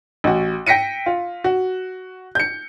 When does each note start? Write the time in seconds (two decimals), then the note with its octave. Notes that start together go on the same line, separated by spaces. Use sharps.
0.24 A1 F#4
0.66 G5 A#6 B6 C#7 D#7
1.06 F4
1.44 F#4
2.35 G6 C#7